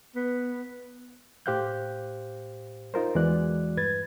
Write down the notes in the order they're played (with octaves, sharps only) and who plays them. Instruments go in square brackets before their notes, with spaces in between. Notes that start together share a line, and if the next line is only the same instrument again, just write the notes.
[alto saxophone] B3
[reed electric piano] A2 G4 C5 F5 F#6 G6
D#4 F4 A#4 C5
E2 E3 G#3 F#4 D5 F#6
G2 B4 G#6 A6